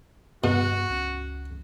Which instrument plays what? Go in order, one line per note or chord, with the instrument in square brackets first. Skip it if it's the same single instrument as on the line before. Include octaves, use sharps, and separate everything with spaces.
[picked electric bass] G2 [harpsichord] B2 [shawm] F#4
[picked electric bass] C#2 C#4